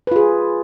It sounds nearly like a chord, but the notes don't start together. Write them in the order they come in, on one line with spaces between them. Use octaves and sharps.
B4 F4 G#4